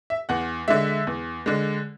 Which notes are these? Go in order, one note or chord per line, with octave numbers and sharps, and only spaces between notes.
E5
E2 F#5
D3 G#3 E5
E2
D3 G#3